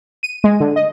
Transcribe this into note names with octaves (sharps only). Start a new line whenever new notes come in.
D#7
G#3
D3
D#5